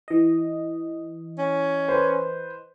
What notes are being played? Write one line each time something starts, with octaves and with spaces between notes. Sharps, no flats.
E3 D#5
C#4
B4 C5